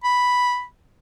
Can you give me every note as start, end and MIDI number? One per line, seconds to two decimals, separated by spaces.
0.04 0.64 83